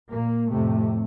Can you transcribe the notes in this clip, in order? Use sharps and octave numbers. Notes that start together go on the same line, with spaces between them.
A#2 A#3
F2 A2 C3 A3